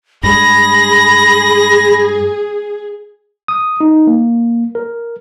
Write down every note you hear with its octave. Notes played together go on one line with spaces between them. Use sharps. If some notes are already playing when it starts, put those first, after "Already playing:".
G2 G#3 G#4 B5 A#6
D#6
D#4
A#3
A#4